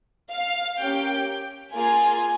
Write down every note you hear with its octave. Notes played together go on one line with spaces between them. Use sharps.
F5
A#3 C#4 G4 G5
A#3 F4 G#4 G#5